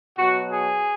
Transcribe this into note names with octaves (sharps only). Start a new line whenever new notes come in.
B2 F#3 F#4
G#4